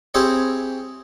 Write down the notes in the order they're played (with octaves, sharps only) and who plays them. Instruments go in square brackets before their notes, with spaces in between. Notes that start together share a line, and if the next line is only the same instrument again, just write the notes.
[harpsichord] C4 E4 G4 G#4 C5 C#5